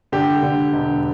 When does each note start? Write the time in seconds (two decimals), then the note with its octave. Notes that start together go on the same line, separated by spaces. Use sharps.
0.12 D3 G4
0.43 D3
0.73 E1